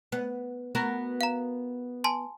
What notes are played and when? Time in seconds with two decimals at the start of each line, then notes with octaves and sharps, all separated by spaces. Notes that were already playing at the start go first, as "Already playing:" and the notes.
0.12 B3
0.75 B3 F#4 A#4
1.21 F5 A#5
2.04 G#5 A5 C6